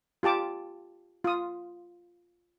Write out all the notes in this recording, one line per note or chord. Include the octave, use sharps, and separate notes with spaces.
F4 G4 A5 D6
F4 D#6